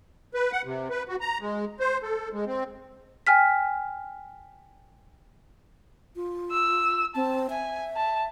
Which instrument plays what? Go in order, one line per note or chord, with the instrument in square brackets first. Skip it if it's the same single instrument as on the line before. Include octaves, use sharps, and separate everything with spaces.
[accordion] B4
F#5
C3
B4
F#4
A#5
G#3
C5
A4
G#3
C4
[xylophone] G5 G#5 F6 B6
[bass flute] F4
[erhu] E6
[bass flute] C4 [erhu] A5
[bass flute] E5 [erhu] G#5
[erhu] A5